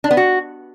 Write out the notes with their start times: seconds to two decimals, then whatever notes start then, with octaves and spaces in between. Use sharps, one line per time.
0.04 D4
0.11 B3
0.17 F#4